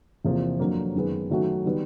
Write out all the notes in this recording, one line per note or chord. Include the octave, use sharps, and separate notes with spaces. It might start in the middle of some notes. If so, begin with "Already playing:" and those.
E2 C3 F3 A#3
F2 D3 F#3 A#3
F#2 D#3 G#3 B3
D#3 F#3 A3 C#4 F#4
D#3 G3 B3